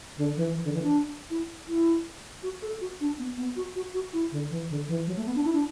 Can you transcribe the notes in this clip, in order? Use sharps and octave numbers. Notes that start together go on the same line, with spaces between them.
D3
E3
E3
D3
E3
D4
E4
E4
F#4
A4
F#4
D4
B3
B3
F#4
F#4
F#4
E4
D3
E3
D3
E3
F#3
A3
B3
D4
E4
D4